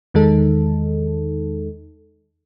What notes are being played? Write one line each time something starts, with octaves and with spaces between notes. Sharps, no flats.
E2 D#3 G#3 D#4 A4